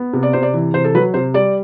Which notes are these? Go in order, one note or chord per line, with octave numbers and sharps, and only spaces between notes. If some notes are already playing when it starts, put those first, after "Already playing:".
Already playing: B3
C3
D5
C3 C5
D5
E3
C3 C5
A4
F#3 B4
C3 C5
G3 D5